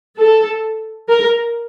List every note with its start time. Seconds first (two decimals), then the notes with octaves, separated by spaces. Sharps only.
0.18 A4
1.09 A#4